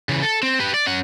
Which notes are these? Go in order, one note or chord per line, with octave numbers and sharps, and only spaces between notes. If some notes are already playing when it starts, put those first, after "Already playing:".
C#3 E3
A4
C4
G4 B4
D5
C#4 F#5